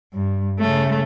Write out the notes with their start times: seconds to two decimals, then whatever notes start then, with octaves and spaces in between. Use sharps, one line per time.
0.14 G2
0.59 C#3 A3